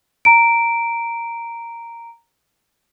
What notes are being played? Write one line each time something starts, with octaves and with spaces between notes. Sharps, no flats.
A#5 D7